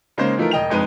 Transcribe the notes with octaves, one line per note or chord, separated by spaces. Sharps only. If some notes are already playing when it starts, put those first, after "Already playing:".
C#3 G#3 A#3 C#4 D#4 C5
E3 F3 A3 D#4 F4 A#4
E1 D#5 G5 F7
G1 F2 G#3 D#4 B4 D#7